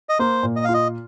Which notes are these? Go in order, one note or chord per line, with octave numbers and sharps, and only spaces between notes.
D#5
A#3 C5
A#2
D#5
F5
F4
D#5